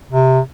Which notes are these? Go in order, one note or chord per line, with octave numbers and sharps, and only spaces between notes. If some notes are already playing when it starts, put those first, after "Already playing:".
C3